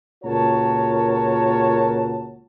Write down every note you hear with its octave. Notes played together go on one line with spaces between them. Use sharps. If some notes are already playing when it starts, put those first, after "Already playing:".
C#2 A#2 F#4 A#4 C#5 A5